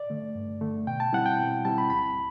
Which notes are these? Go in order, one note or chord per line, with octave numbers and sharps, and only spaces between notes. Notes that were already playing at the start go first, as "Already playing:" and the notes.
Already playing: D5
D3 A3
G2
D3 A3
B2 G5
A5
G3 C4 E4 F#5
G5
B2
G3 C4 E4 A5
B5
D2 B5